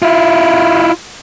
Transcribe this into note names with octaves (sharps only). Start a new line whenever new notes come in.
E4 F4